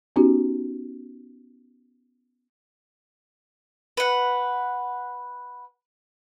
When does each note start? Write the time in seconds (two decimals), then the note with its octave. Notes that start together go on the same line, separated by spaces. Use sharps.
0.16 B3 C#4 D#4 F#4 G4
3.97 B4 F#5